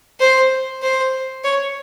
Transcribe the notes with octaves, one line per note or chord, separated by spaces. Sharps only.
C5
C5
C#5